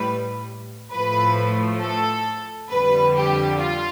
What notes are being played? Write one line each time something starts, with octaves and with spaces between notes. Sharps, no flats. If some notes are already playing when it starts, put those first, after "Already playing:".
Already playing: A2 G3 B4
A2 F3 A3 B4
A4
F2 D3 G3 B4
G4
F4